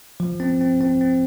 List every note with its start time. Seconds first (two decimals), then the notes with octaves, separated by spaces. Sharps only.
0.20 F3
0.40 C4
0.61 C4
0.81 C4
1.01 C4